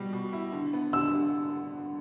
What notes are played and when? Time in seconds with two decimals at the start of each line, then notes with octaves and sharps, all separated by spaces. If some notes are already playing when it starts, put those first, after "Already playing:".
Already playing: B2 G3
0.13 B2
0.33 E4
0.52 D3
0.73 B3
0.93 D3 E6